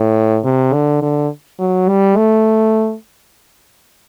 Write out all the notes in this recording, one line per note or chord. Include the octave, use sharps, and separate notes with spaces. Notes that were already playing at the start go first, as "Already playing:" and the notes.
Already playing: A2
C3
D3
D3
F#3
G3
A3